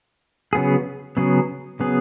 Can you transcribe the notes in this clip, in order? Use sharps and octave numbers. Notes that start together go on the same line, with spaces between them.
C#3 F#3 B3 G#4
C#3 F#3 B3 G#4
C#3 F#3 B3 G#4